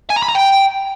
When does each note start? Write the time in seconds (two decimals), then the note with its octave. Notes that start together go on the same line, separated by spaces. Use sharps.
0.10 G#5
0.16 A#5
0.23 B5
0.29 A#5
0.35 G5